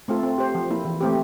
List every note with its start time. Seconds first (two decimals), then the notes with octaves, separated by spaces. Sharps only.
0.08 A3 C4 F4 A4
0.23 C4
0.38 G4 C5
0.55 F3
0.70 A#3 E4
0.85 E3
1.01 A3 C4 G4